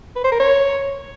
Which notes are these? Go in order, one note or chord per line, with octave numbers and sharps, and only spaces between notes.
B4
C5
A#4
C#5